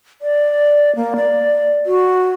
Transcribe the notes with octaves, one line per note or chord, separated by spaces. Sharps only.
D5
A#3
D5
F#4